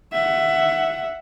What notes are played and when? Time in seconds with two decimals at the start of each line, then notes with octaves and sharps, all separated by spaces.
0.12 E5 F#5